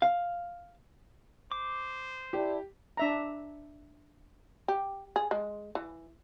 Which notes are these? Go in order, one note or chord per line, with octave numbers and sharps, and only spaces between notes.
F5
C5 D6
E4 G4 D5 A5
D4 E5 A#5
G4
G#4
G#3
E3